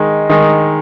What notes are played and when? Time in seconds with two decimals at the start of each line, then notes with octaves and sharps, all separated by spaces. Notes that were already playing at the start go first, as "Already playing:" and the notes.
Already playing: D#3 G#3 D#4
0.30 D#3 G#3 D#4